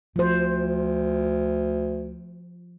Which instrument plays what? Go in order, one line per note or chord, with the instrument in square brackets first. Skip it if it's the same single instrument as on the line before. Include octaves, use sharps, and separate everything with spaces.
[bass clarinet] D2 [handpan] F3 C5